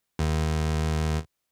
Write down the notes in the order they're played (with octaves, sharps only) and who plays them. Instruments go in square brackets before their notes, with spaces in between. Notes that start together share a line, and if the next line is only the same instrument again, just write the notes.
[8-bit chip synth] D#2